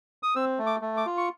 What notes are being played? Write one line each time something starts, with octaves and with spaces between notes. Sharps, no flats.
D#6
C4 E6
A3
D6
A3
D6
F4
C#6